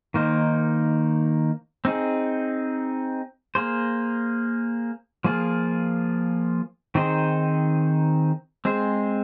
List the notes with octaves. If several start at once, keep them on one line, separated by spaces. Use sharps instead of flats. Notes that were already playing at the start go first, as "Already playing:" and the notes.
D#3 A#3 D#4 C5
C4 D#4 G#4
A#3 G#4 C5
F3 A#3 F4 G#4
D#3 C4 D#4 G#4 C5
G#3 C4 G#4 C5